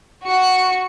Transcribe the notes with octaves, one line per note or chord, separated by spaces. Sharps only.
F#4 C#7